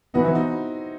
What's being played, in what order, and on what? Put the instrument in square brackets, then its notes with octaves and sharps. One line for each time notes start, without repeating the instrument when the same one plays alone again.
[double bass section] E3 B3 [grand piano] D#4 F#4
[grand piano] C4 E4
D#4 F#4